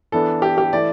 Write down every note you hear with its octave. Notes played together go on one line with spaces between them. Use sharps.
E3 B3 D4 A4
G4
G4
E3 A3 E4 D5